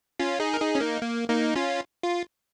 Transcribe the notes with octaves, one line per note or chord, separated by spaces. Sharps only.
C#4 F4
D#4 G#4
A#4
D#4 G#4
C#4
A#3 D#4
A#3
A#3 D#4
C#4 F4
F4